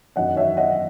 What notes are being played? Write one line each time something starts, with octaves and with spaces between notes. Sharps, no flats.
F#2 D#3 F#3 D#5 F#5
C#5 E5
D#5 F#5